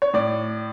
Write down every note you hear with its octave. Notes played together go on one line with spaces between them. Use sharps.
C#5
A2 D5